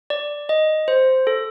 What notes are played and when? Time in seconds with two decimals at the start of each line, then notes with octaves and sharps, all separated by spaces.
0.10 D5
0.49 D#5
0.88 C5
1.27 A4